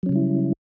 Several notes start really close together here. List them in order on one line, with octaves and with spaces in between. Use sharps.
F#3 C#4 C#3 G3 E4